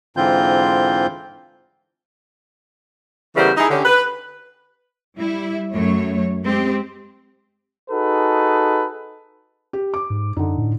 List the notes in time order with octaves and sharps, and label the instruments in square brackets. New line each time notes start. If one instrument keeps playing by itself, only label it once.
[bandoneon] G#2 D3 E3 C4 F4 G6
[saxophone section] C#3 E3 G3 B3 A#4 C5
D#4 E4 G#4
D3 C#4 G4
B4
[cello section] G3 E4
F#2 A3 C#5
G#3 C4 G4
[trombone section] D#4 F#4 G#4 A4 B4
[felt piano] G4
D6
[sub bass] G#2
[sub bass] F#2 [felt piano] D3 D#4
[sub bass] A2